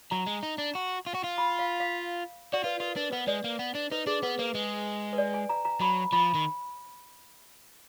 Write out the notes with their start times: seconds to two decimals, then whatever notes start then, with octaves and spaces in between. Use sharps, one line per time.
0.11 F#3 A#5
0.26 G#3
0.43 D#4
0.58 D4
0.75 F#4
1.06 F4
1.15 F#4
1.24 F4
1.38 B5
1.59 F5
1.80 F5
2.53 F#4 D5
2.64 F4 B4
2.80 F4 A#4
2.96 D4 B4
3.12 B3 B4
3.27 G#3 D5
3.44 A#3
3.59 B3
3.75 D4
3.91 D#4 B4
4.07 D4 G#4
4.23 B3 B4
4.39 A#3 B4
4.55 G#3
5.13 B4
5.18 D5
5.34 G#5
5.49 A#5
5.65 A#5
5.80 F#3 B5
6.12 F3 B5
6.34 D#3